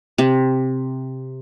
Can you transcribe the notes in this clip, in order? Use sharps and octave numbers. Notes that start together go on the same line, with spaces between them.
C3